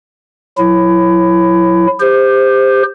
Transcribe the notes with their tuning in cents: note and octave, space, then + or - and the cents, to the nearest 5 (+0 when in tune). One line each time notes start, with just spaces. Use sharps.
F#3 -20 E4 +20
G4 +30 C5 -5